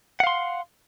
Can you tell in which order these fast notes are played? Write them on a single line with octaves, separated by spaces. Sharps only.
F#5 F5 C6